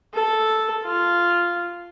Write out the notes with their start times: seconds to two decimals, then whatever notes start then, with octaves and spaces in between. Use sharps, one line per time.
0.14 A4
0.85 F4